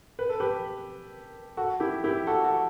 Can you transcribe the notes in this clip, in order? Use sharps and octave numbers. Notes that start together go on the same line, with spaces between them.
B4
A4
G4 B4
F#4 A4
E4 G4
E4 G4
F#4 A4
F#4 A4